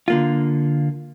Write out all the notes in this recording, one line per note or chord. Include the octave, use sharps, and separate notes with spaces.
D3 A#3 F4